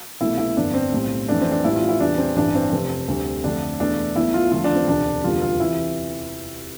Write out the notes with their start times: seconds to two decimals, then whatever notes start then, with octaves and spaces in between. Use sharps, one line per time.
0.21 C2 B2 A3 E4
0.38 E4
0.57 G1 F2 D3 D4
0.74 C4
0.92 B1 A2 G3
1.28 F2 E3 A3 D4
1.41 C4
1.52 D4
1.64 A1 A2 E3 G3 E4
1.76 F4
1.89 E4
2.00 E2 C3 E3 G3 D4
2.18 C4
2.37 A1 G2 E3 G3 D4
2.55 C4
2.72 F1 F2 C3
3.08 D2 C3 G3
3.44 F2 D3 A3 D4
3.80 E2 B2 A3 D4
4.16 B1 B2 A3 E4
4.34 F4
4.51 E2 D3 F3 A3 F4
4.64 D4
4.75 C4
4.88 E1 D2 C3 D4
5.24 F1 E2 D3 G3 F4
5.42 F4
5.60 C3 E3 E4